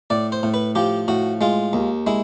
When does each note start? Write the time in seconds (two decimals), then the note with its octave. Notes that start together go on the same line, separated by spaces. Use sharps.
0.10 A2 D5
0.32 C5
0.43 A2
0.54 B4
0.75 F3 G4
1.08 A2 F#4
1.41 G#3 F4
1.73 D#2
2.07 G#3 E4